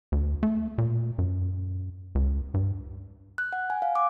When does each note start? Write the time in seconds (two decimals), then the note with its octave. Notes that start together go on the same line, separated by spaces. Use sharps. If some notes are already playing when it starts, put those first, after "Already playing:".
0.12 D2
0.43 A3
0.78 A#2
1.18 F#2
2.15 C#2
2.54 G2
3.38 F#6
3.53 F#5
3.70 G#5
3.82 F5
3.95 D6